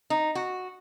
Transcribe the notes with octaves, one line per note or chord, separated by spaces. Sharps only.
D#4
F#4